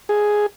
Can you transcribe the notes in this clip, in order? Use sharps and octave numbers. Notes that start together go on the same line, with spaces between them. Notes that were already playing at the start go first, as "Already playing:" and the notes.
G#4